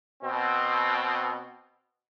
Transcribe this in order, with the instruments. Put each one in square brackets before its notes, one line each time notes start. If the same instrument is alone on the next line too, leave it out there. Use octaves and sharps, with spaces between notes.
[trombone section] B2 C4